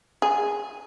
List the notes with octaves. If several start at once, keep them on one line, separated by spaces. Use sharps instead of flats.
G#4